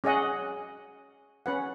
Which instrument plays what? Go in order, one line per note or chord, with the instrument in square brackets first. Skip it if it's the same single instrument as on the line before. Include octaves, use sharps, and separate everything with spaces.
[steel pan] C#4 G#4 D#5 F#5
C#4 B4 F#5